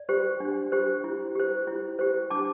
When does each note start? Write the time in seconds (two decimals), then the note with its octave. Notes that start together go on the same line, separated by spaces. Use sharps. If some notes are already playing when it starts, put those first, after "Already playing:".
Already playing: D5
0.09 G4 C5
0.40 D4
0.72 G4 C5
1.04 E4
1.35 G4 C5
1.67 E4
1.99 G4 C5
2.30 D4 A5 D6